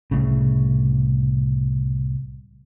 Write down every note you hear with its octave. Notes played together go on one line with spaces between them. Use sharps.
C2 A2 C#3